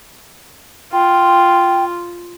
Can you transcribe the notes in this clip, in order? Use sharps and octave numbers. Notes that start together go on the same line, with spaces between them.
F4 G5